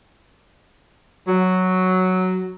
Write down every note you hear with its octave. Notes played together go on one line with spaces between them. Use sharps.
F#3